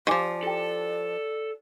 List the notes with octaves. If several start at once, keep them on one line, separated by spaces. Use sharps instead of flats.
D#3 F3 G4 D5 G#5 D6
E4 G4 A4 G5